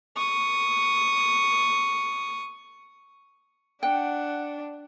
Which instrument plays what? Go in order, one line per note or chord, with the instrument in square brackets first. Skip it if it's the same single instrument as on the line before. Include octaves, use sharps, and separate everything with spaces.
[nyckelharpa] C#6 D#6
[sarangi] D4 [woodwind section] F#5 [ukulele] G5